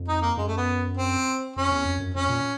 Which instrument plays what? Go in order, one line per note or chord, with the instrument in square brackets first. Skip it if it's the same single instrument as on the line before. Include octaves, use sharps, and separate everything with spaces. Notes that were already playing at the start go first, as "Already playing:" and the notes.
Already playing: [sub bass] F2
[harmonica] D#4
A#3
[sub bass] F#2 [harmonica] G#3
[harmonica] A3
B3
C4
[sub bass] F2 [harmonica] C#4
[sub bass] E2
F2
F#2
[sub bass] F2 [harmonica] C#4
[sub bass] A#2